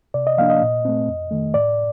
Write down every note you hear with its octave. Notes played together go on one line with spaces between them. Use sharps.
C3 D5
D#5
F3 A#3 D4 F5
D#5
A#2
A3 C4
F2
D#3 A3
A2 D5